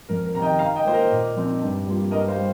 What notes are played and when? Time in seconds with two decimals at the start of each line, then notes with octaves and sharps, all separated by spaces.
0.09 F2 A#4
0.26 A#4
0.34 C3 A#5
0.38 D#3 D#5 G5
0.59 D#3 F5 A#5
0.76 D#5 G5
0.85 A#3 F4 C5
0.93 A#4 D#5
1.10 A#2
1.35 F3 C4 D#4
1.61 G2
1.86 G3 A#3 F4
2.11 G2 A#4 D#5
2.28 C5 F5
2.37 G3